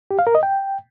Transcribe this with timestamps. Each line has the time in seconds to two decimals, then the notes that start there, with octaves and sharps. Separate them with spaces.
0.11 G4
0.19 F5
0.27 A#4
0.35 D#5
0.43 G5